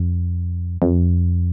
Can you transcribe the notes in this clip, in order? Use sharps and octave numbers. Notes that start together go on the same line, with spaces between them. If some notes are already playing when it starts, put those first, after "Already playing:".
Already playing: F2
F2